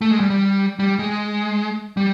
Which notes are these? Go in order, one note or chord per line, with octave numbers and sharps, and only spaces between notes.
A3
G#3
G3
G3
G3
G#3
G3